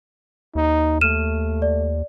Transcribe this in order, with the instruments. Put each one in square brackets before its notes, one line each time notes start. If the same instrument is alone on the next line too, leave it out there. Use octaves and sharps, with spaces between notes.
[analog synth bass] D#2 [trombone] D#4
[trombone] A3 [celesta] F6 D#7 E7
[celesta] D5